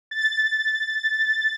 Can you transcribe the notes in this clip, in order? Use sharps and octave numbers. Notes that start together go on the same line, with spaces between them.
A6